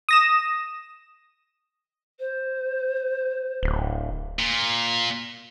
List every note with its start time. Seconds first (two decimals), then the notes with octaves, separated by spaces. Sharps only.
0.09 D#6 A#6 E7
2.20 C5
3.63 D1
4.39 A#2